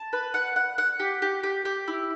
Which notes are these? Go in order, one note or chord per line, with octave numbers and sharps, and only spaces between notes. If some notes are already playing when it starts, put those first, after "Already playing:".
Already playing: A5
B4
F#5
F#5
F#5
G4
G4
G4
G4
E4